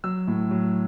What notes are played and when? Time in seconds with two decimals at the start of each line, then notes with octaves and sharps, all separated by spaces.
0.04 F#3 E6
0.27 A2
0.51 F#3